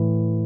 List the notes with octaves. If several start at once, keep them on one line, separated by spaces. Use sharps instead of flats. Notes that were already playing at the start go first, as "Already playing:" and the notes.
Already playing: A2 E3